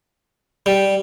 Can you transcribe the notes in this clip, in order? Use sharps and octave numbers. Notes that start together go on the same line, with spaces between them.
G3